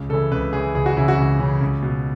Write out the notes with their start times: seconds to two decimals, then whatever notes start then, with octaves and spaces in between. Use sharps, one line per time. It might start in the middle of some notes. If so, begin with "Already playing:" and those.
Already playing: C#2
0.09 C#3 A4
0.13 E3
0.31 C#2 B4
0.53 C#3 E3 G#4
0.75 C#2 G#4
0.86 F#4
0.96 C#3 E3 E4
1.08 F#4
1.18 C#2
1.39 C#3 E3
1.61 C#2
1.83 B2